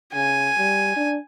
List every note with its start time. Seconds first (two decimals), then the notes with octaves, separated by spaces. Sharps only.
0.14 C#3 G#5
0.57 G3
0.96 D4